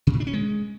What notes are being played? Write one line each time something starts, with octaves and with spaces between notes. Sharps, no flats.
C3
A#2
D4
C#4
G#3